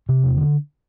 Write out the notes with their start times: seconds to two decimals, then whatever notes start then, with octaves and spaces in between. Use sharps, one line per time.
0.09 C3
0.24 E1
0.38 D3